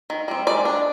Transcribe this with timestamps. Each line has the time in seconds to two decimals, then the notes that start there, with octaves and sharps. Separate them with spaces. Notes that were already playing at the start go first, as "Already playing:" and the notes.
0.10 D#3
0.28 G3 C4
0.47 G#3 D5
0.65 D4